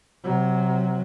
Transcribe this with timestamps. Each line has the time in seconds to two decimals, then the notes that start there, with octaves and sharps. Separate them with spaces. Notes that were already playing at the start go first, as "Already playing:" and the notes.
0.24 C3 F#3